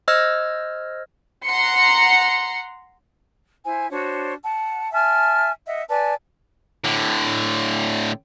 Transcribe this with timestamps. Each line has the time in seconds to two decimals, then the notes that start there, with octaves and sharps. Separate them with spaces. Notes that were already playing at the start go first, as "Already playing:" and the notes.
0.08 C5 D#5 E6 F6 G#6 A#6
1.47 F#5 A#5 C6 C#7
3.64 E4 C5 G#5
3.90 D4 F#4 C5 C#5
4.43 F#5 A5
4.93 E5 G#5 A5 F6
5.67 D#5 E5 F#5
5.89 B4 D5 G#5 A5
6.84 A2 D3